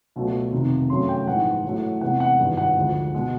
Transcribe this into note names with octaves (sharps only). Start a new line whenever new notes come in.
C#2 B2 F#3 A3
F1 F2 C3 D#3
F#2 C#3 F#3 A3 C6
G5
A#1 G#2 E3 G#3 F#5
A1 A2 F#3 A3
E2 C3 E3 G#3 F#5
F#5
G#1 G2 E3 G3
F#5
D2 D3 F3 G#3
B2 G#3